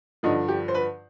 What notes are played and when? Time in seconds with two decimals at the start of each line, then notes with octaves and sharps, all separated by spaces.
0.23 G2 D3 F3 D#4
0.48 G4
0.68 C5
0.74 B4